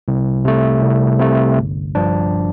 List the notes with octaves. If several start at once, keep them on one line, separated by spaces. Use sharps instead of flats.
C2
C3 A3
C2
C3 A3
G1
G2 F3 D4